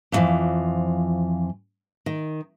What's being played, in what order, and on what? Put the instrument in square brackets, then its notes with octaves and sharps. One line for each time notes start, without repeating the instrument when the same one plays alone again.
[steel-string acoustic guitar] F2 A2 D3 E3 F3
D#3